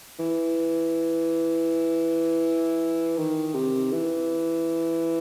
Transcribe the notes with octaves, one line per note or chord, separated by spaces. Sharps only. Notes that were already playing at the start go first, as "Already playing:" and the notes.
E3
D#3
C3
E3